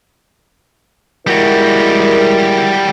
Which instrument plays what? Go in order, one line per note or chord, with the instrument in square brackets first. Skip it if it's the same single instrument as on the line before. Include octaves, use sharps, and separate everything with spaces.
[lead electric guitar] G3 F#4 [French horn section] G#3 E4 A#4